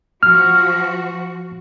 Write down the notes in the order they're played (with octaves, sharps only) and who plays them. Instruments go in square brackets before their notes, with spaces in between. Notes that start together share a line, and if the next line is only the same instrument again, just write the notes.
[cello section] F3 F#4 [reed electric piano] F6